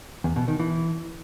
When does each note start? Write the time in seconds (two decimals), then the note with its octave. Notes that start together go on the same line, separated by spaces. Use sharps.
0.24 E2
0.36 B2
0.48 D#3
0.59 E3